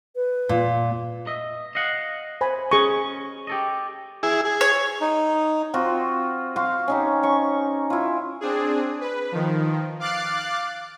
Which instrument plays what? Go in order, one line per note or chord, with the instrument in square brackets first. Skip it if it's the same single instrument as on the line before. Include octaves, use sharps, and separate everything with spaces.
[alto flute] B4
[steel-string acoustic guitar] A#2
[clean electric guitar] D#5 E5
D#5 F5 F#5
[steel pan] C5 G#5 B5
[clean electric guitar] C#4 D#5 [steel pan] G#4 C#6
[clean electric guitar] G4 A4 D#5
[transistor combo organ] E4 G#4
G#4
[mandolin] C#5
[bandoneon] D#4
[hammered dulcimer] C4 F4 F#4
F#4 F5 C6
C#4 D#4 G4
C#4 C#6
E4 F4
[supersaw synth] C4 D4 G#4
B4
D#3 F3
F5 D6 F#6 A6 C7